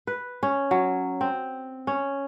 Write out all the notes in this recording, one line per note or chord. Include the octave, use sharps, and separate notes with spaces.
B4
C#4
F#3
C4
C#4